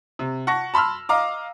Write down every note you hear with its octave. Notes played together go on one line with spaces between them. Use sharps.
C3
F#5 A5 C#6 A#6
A5 B5 C6 E6 F6
D#5 F5 A#5 D6